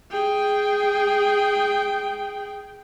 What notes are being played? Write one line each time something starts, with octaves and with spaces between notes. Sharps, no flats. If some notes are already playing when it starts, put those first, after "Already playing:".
G#4 G5